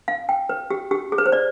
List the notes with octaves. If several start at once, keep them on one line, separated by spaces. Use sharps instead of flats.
F5
G5
B4
G4
G4
G#4
B4
C5
D5